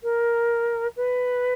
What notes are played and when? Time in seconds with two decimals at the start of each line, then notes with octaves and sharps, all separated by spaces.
0.03 A#4
0.96 B4